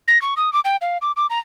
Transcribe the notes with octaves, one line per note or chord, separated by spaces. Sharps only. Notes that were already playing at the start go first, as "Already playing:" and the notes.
A#6
C#6
D#6
D6
G5
F5
D6
D6
A#5